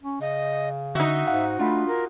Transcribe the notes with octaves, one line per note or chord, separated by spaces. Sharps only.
C#4
C#3 D#5
D3 D#4 F#4 E5
G#2 F5 F#5
A3 D4 F4 F#5 B5
A#4